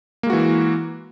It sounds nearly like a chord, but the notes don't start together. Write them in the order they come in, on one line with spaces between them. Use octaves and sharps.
A#3 G#3 F#4 E3